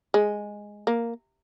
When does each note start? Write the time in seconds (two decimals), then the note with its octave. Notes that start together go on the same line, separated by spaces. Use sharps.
0.14 G#3
0.87 A#3